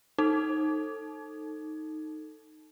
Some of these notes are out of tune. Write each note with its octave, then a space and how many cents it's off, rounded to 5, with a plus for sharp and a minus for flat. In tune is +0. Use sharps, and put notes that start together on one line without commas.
D#4 +0 A4 +10